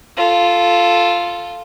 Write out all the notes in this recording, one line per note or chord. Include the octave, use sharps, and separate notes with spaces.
F4 A4